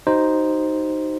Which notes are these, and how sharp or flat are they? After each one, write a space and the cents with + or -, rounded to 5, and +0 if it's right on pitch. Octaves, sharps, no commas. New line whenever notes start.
D#4 +0 F#4 +40 C5 +0